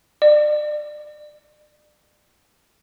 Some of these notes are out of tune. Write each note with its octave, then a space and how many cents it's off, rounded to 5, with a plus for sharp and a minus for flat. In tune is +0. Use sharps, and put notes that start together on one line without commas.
D5 +30